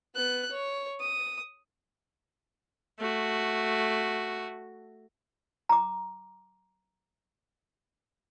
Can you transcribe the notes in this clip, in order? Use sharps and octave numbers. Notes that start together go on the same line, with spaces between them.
B3 F#6
C#5
D#6
A3 F#4
A#5 D6